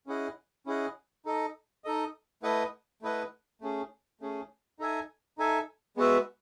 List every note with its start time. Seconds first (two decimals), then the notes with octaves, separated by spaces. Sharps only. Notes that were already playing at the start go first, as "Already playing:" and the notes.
0.06 C#4 E4 G#4 D#5 F#5
0.66 C#4 E4 G#4 D#5 F#5
1.25 D#4 A4 D#5
1.84 D#4 A4 D#5
2.42 A3 E4 B4 D#5 F#5
3.02 A3 E4 B4 D#5 F#5
3.61 A3 C#4 G#4
4.20 A3 C#4 G#4
4.79 D#4 A4 E5 G#5
5.38 D#4 A4 E5 G#5
5.97 G#3 B3 F#4 B4 E5